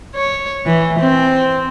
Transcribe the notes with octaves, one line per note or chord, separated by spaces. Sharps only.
C#5
E3
C4